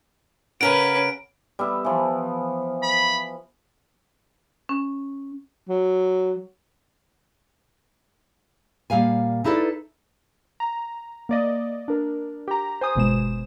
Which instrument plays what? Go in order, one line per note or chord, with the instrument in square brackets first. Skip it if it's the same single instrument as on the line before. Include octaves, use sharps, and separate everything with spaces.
[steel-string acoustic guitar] C#3 A#4 F#5 [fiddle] C#4 B4 [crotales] D7
[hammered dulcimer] G3 B3 E5
E3 F3
[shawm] B5
[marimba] C#4
[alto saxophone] F#3
[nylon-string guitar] A#2 G3 F5 G#5
D#4 E4 A4 B4 D5
[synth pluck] A#5
A#3 D5 D#5
D4 A#4
G4 A#5
C5 G#5 D#6
G1 B2 G#3 E7